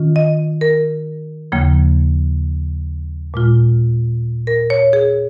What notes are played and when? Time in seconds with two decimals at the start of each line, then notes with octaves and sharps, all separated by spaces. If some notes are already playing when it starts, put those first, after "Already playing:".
Already playing: D#3 C#4 F4
0.16 D#5
0.61 A#4
1.52 D#2 C#3 F3 A#3
3.34 A#2 G#3 F4
4.47 A#4
4.70 C#5
4.93 G#4